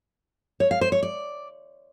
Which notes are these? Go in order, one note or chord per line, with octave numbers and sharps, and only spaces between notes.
C#5
F5
C5
C#5
D5